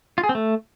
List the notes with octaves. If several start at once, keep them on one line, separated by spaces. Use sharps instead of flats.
F4
G#4
C4
A3